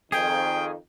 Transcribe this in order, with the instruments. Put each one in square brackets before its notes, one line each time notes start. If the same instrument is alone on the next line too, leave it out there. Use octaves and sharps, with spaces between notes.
[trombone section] F2 D#3 [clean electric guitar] G#4 [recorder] G5